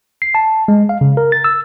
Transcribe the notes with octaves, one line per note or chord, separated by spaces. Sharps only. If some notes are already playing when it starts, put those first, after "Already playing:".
C7
A5
G#3
F5
C#3
A#4
A6
E6